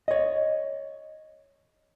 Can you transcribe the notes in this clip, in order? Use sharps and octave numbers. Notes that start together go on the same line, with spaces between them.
C#5 D#5